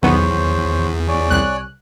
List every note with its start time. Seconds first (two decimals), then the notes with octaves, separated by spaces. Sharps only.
0.02 B1 E2 D#3 B3 C5 C#5
1.08 C#5 D5 G#5
1.30 C2 F#6